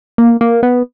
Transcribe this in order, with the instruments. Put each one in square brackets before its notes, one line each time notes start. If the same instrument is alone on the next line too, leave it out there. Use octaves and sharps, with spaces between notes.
[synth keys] A#3
A#3
B3